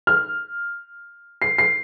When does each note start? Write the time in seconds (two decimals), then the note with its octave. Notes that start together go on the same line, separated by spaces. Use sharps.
0.07 F6
1.42 C7
1.58 C7